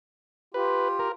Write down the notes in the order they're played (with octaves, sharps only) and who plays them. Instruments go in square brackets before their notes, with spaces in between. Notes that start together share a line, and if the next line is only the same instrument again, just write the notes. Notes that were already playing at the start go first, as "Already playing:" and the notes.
[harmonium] F4 G4 [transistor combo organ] B4
[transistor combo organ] A#4